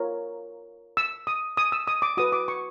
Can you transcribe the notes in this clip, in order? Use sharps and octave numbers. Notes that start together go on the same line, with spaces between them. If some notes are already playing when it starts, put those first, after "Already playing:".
Already playing: F4 A#4 C#5
E6
D#6
D#6
E6
D#6
D6
F#4 B4 D#6
D6
C#6